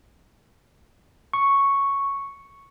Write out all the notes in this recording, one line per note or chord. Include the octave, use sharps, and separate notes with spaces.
C#6